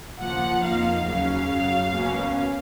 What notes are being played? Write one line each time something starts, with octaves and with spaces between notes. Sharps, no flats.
D#2 C#3 F3 A#3 F#5
F2 F3 A#3 D#4 F5
D#2 C#3 F#3 C#4 F5
F#2 C#3 F#3
C#2 B2 A#3 C#4